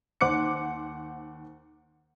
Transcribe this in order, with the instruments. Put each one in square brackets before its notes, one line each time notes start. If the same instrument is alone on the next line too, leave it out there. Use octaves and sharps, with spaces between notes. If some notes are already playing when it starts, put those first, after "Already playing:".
[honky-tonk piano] D#2 C5 F#5 D6 F#6 C#7